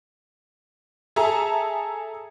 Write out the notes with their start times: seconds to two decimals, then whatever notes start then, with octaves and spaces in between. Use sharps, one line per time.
1.16 G#4 A4 E5 A5 A#5